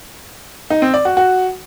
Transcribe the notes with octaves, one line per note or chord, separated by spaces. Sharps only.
D#4
C4
D5
F#4
F#4